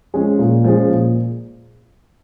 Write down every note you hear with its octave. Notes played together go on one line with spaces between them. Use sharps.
F3 G#3 C#4 G#4
A#2
F3 G#3 C#4 G#4
A#2